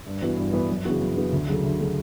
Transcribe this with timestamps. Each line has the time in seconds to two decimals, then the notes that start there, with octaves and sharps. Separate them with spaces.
0.07 G2
0.22 E3 B3 F#4 B4
0.37 G2
0.53 E3 B3 F#4 B4
0.69 F#2
0.85 C#3 E3 B3 F#4
1.01 F#2
1.16 C#3 E3 B3 F#4
1.32 D2
1.48 C#3 F#3 A3
1.64 D2
1.80 C#3 F#3 A3